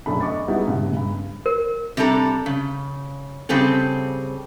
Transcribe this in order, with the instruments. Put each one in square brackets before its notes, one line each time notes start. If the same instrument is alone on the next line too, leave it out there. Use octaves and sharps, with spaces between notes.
[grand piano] F1 F#2 A3 D4 B5
D#5 C#6 D6 A6
G3 G#3 B3 D#4 E4 F#4
G2 C#3
G2 B5
[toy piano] A#4
[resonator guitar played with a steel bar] C3 G3 D4 A4 A#5
C#3
C#3 G3 C4 G#4 A4